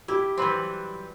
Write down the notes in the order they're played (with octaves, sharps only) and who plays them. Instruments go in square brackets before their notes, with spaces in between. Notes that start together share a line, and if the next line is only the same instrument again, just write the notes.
[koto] E4 [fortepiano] G4
[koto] E3 C4 [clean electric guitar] F#3 G3 B4 [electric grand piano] C5